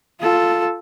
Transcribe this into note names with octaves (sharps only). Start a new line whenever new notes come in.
F4 A4